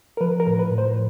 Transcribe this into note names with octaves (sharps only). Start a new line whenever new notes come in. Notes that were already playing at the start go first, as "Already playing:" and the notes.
A#4
F3 B4
A#4
A2
B4
A2
C5